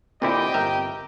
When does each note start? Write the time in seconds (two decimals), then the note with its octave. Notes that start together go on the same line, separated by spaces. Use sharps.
0.22 A#2 D3 C4 E4 G4 D#5 G5
0.54 G1 A#4 E5